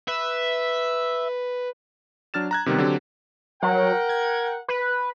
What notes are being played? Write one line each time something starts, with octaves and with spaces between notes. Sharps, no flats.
B4 E5
F#3 D4 F6 A6 E7
A#5 F#6 G#6
C3 D#3 G3 B3
D3 F#3 C4 G4
F#3 A#4 F#5 G5
G#6
B4